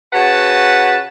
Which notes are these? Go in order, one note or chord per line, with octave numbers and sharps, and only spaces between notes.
C#3 F#4 B4 F#5 A5